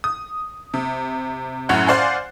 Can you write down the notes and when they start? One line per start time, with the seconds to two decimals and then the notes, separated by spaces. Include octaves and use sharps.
0.04 D#6
0.74 C3
1.69 F#2 A2 C#4 F#5 F#6
1.87 C5 D5 F5 F#5 G#5